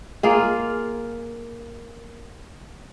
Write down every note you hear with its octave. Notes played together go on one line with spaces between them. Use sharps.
A#3 F4 G#4